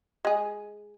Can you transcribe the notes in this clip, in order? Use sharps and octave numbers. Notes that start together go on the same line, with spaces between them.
G#3 G#4